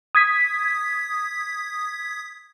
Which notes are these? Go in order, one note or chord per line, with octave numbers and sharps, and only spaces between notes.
D#6 G#6 B6